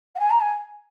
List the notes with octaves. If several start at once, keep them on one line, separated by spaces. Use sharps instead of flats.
F#5
G#5
A#5
G#5